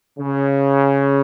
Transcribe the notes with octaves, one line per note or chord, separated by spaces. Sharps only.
C#3